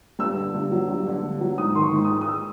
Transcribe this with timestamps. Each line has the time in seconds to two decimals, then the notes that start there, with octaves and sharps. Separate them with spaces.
0.19 G2 E6
0.37 D3
0.54 G2
0.72 F#3
0.89 G2
1.07 D3
1.23 G2
1.41 F#3
1.58 G#2 D#6
1.75 D#3 C6
1.81 C#6
1.93 G#2
2.05 D#6
2.10 G#3
2.21 D#6
2.28 E6